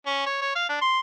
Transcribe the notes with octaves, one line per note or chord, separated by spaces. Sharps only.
C#4
C#5
C#5
F5
D4
C6